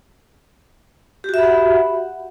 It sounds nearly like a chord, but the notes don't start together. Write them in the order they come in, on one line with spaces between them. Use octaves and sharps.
G4 F#4 E5 B5 F#5